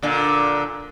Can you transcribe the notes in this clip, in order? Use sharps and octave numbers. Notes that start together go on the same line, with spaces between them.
A#2 D3